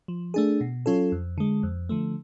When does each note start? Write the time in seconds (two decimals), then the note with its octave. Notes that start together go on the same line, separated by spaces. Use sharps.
0.08 F3
0.34 A3 D4 G#4
0.61 B2
0.86 F#3 C#4 F4 A4
1.12 F2
1.38 D3 G#3
1.63 F2
1.89 D3 F3 A3